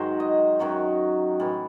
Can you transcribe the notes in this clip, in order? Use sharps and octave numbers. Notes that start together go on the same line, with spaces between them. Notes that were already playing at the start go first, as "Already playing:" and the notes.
Already playing: G#2 D#3 F#3 C5
D#5
F#2 D#3 F#3 C#5
A2 E3